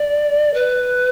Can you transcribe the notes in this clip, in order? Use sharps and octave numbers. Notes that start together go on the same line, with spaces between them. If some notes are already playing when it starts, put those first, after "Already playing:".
Already playing: D5
B4